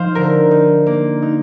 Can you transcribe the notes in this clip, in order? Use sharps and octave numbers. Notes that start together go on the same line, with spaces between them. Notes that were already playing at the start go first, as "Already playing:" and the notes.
Already playing: F3 D#4 C5 F5
D3 A#4
D#4
A#3
D#4